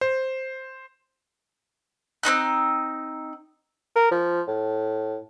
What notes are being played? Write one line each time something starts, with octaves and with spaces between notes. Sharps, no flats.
C5
C4 C#4 D#4 F#6
A#4
F3
A2